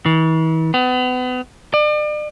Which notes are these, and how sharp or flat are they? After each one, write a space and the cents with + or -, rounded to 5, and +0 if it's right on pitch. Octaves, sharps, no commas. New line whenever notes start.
E3 -40
B3 +35
D5 +40